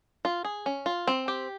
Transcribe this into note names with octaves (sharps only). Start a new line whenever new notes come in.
F4
G#4
C#4
F4
C4
G4